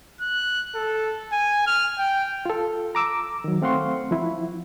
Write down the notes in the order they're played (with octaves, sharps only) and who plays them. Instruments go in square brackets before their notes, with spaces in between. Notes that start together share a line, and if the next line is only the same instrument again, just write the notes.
[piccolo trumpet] F#6
A4
G#5
F6
G5
[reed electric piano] F4 A4
A#5 D6 E6
D#3 F#3
A3 C4 F5 F#5 C6 C#6
F3 E4